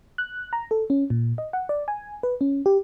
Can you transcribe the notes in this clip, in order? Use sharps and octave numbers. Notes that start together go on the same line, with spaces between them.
F#6
A#5
A4
C#4
A#2
D#5
F#5
D5
G#5
B4
C#4
G4